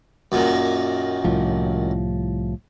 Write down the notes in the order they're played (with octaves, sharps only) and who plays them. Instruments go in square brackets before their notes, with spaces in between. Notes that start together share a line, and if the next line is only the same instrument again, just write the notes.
[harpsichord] F#2 A#2 D#3
[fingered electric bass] C2 A2 F3